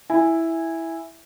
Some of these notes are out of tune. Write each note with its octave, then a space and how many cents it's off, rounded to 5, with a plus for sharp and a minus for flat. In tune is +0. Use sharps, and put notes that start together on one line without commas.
E4 +0 G#5 -15